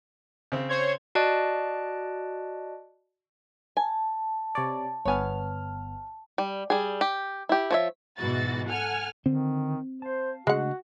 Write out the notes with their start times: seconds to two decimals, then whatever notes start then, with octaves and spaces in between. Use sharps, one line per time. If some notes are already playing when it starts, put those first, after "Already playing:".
0.52 C#3 C4
0.69 C5 C#5 G#6
1.15 F#4 D5 D#5 A5 F#6 D7
3.77 G#5 A5
4.55 C3 C#5 D5
5.05 G1 B3 C#5 G#5 F6
6.38 G3
6.70 G3 G#4
7.01 G4
7.49 E4 G4
7.71 F3 C#5 E5
8.18 G#2 B2 E3 F#4 A6
8.67 A4 F#5 G#5 F6
9.26 D3 D#3 C4
10.02 C5 F5 A5
10.47 C#3 G#3 A3 D4 F#4 F#5